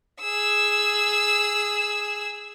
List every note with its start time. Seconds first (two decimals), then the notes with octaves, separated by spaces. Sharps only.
0.21 G#4 E6